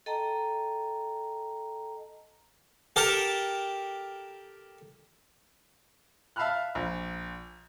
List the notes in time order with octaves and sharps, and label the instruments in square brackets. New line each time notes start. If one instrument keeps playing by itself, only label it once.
[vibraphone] A4 D#5 G5 A5 A#5
[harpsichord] G4 A4 A#4 A5
[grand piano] E5 F5 A5 B5 F6 F#6
A#1